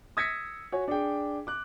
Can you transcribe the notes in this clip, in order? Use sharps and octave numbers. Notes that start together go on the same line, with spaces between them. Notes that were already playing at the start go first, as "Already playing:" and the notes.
D#6 E6 G#6 A#6 B6 C#7
F#4 C#5 G#5
D4 G#4 G5
D6 F#6